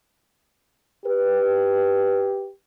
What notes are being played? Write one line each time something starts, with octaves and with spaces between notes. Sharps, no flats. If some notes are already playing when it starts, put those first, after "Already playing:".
G4 B4